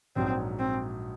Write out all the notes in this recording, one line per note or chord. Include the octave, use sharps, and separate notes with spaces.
A#1 G#2 F#3 C4
C4